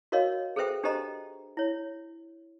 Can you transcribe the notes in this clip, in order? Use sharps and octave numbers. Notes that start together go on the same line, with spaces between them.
F#4 A#4 C#5 D#5 F5
G#4 A4 B4 C5 E5 G5
D4 G4 A4 C5 D#5 A#5
E4 C#5